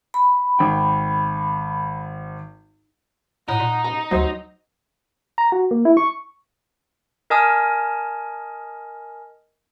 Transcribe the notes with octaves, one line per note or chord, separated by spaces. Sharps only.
B5
G#1 G5
A2 D#4 F#5
A#2
A#5
D2 F#3 C5 D#5
A#5
F#4
A#3
E4
C#6
A#4 D#5 G#5 A5 D#6 F6